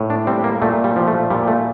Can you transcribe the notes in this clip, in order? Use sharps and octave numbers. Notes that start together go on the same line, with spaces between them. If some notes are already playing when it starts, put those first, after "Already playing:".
Already playing: A2
D4
G3 C4
A#3
A#2 A3
G3
F3
A3
A#2 G3
A3